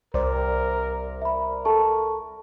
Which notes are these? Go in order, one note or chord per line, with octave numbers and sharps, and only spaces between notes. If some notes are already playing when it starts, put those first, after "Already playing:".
C2 A#4 C5 D5
A#4 E5 B5
A4 A5 C#6